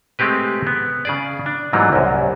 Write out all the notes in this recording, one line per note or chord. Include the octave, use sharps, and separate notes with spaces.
G#3 A3 C4 G4 B4
B3
C#3 G#4 D5
D4
G#2 E3 F#3 G3 A#3
C2 F#2